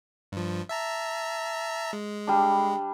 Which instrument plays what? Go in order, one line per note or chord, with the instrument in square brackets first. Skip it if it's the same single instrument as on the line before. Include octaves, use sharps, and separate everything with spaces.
[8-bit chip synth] G2 F3
E5 A5 A#5
G#3
[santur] G3 D4